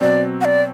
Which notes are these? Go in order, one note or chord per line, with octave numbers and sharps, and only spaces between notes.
B2 F#3 C4 D5
F#5
D5